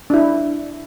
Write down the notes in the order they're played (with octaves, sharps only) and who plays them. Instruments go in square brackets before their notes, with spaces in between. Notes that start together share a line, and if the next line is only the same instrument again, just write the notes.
[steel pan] D4 E4